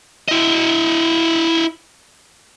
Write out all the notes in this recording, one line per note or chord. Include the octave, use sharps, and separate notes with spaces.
E4 D#5